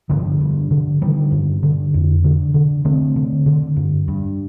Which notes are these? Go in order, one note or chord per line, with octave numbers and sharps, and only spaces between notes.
G2 D3 F3
G2
D3
D3 D#3 G3
G2
D3
F2
D3
D3
D3 A3 C4
D3
D3
G2
G2